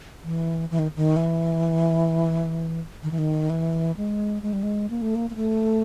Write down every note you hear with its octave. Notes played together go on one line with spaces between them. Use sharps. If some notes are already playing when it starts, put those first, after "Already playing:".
E3
E3
D#3
D#3
E3
D#3
E3
D#3
E3
G#3
G#3
G3
G#3
A#3
A3
A#3
A#3
A3